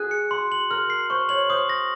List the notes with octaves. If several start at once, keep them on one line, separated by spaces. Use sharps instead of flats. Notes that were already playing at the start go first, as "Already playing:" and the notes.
Already playing: F#4 G#4 F#6
C#7
C6
F#7
A#4 F6
C7
C5 C#6
C#5 F#7
C5 D#6
A#6